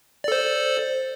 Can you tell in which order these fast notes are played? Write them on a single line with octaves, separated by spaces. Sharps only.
D5 A4 C5